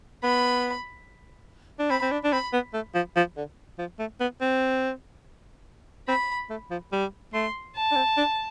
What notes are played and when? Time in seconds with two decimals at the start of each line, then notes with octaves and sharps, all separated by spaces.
0.23 B3 B5
1.79 D4
1.90 C4 B5
2.02 C4
2.11 D4
2.24 D4
2.32 C4 B5
2.53 B3
2.74 A3
2.95 F3
3.16 F3
3.37 D3
3.79 F3
3.99 A3
4.20 B3
4.41 C4
6.08 C4 B5
6.50 A3
6.71 F3
6.92 G3
7.34 A3 C6
7.76 A5
7.91 D4
7.96 C4
8.17 D4